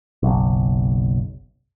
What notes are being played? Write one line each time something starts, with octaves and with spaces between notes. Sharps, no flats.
F#1 B1